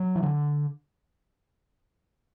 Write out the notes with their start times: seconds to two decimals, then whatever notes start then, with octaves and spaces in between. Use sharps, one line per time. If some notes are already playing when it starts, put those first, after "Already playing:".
Already playing: F#3
0.16 E3
0.23 D3